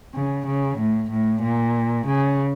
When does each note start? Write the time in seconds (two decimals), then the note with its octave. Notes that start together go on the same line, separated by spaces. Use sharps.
0.15 C#3
0.46 C#3
0.78 A2
1.11 A2
1.43 A#2
2.07 C#3